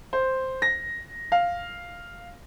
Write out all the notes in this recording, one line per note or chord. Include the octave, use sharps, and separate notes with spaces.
C5
A#6
F5